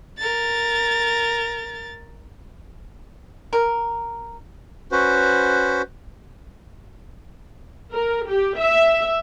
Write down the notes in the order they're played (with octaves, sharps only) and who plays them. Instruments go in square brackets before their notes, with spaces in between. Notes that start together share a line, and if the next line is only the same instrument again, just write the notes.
[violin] A#4 A6
[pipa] A#4
[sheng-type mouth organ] C#4 F#4 B4 C5
[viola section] A#4
G4
E5